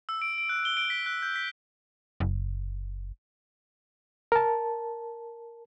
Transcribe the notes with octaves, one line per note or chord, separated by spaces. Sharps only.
E6
D7
D7
F#6
G7
D7
B6
F#6
G6
B6
F#1
A#4 A5